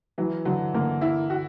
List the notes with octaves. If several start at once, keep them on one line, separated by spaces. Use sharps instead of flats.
E3 F#3
D3 F#3
D3 A#3
E4
F#4